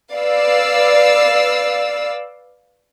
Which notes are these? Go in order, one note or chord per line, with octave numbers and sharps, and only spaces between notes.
B4 D5 F5 E6